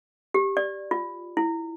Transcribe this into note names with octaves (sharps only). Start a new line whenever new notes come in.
G4
D5
F4
E4